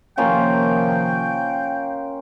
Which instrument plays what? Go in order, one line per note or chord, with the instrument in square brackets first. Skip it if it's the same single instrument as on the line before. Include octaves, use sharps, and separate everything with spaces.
[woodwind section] C3 D#3 F3 [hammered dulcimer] A#3 C#4 F4 [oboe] G5